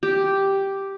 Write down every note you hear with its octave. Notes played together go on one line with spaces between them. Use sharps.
G4